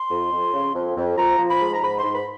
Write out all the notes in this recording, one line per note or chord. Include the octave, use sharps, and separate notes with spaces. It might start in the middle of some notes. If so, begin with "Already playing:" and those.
Already playing: C6
F2
F2
C#3
F2
F2
F3 A#5
F3
B5
G#2
A#5
G#2 B5
C6
G#2
B5